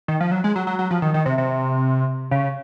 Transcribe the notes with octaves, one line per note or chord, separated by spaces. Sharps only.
D#3
F3
F#3
G#3
F#3
F#3
F#3
F3
D#3
D#3
C3
C3
C#3